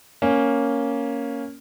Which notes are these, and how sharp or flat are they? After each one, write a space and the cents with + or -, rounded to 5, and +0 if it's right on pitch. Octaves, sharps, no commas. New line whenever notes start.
A#3 +0 C#4 +0